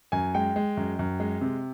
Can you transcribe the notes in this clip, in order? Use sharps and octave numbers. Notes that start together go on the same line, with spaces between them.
F#2 G#5
G#3 G5
G#3
F#2
F#2
G#3
C3